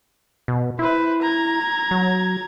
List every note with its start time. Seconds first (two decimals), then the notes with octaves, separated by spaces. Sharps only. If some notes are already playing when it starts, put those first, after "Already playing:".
0.48 B2
0.79 E4 B4 C5
1.22 A#5 G#6
1.91 F#3